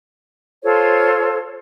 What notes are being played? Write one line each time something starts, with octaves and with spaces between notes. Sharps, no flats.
F4 A4 C5 C#5